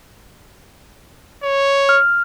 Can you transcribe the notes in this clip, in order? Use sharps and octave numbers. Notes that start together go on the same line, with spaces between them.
C#5
F6